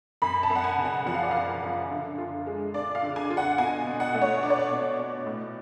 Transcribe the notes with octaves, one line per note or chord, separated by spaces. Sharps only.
F#2 B5
A5
F#2
F#5
G#5
C#3
F#5
F3 F#5
F5
D5
F#2 F5
F#2
D3
F4
G#3
D4 D5
F5
D3
G#5
F4
F#5
B2 G#5
B2
F#5
A3
C#5
D4 D5
C#5
D5
B2
B2
A2